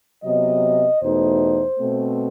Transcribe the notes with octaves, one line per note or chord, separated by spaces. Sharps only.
C3 F#3 B3 D#5
E2 B2 A3 D#4 C5
B2 A3 C4